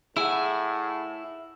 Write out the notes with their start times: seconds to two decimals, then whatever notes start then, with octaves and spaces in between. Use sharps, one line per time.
0.17 A2 E4 G#4 F#5 G#5 E6